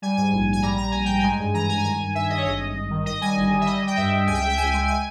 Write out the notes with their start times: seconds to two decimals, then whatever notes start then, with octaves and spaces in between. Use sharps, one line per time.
0.02 G3 G#5
0.17 G#2 G#5
0.32 A#1
0.47 A#1
0.53 G#5
0.62 G3 A#5
0.77 G3 A#5
0.91 A#1 G#5
1.05 G#2 G5
1.20 G#3 G#5
1.39 G2
1.53 E3 A#5
1.69 G2 G#5
1.78 A#5
1.84 D#3 G#5
1.99 G2
2.14 G2 E5
2.30 G2 D#5
2.38 C#5
2.45 G#1 D#5
2.60 G#1
2.75 G#1
2.90 D#3
3.06 D#3 D#5
3.21 G3 G#5
3.37 G1
3.51 G3
3.61 E5
3.67 G3 D#5
3.82 G3
3.87 G5
3.97 G2 E5
4.12 G2
4.27 C#2 G#5
4.34 G5
4.42 C#2 E5
4.49 G5
4.57 C#2 G#5
4.73 G#3 G#5
4.88 G#5